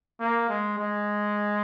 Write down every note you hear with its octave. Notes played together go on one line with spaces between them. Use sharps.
A#3
G#3
G#3